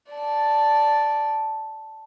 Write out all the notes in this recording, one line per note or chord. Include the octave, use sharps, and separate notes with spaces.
D5 A5